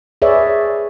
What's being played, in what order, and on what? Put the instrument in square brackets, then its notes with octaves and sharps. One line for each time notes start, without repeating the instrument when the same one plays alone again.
[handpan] G#4 B4 C#5 D5 E5